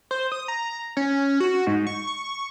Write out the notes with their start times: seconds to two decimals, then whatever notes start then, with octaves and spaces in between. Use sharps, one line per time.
0.11 C5
0.32 D#6
0.48 A#5
0.97 C#4
1.40 F#4
1.67 G#2
1.87 C#6
2.07 C#6